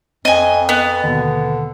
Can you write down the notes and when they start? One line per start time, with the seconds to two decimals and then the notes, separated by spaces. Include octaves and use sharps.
0.25 F2 C4 D#5 G#5
0.69 B3 F#6
1.04 D#2 B2 D3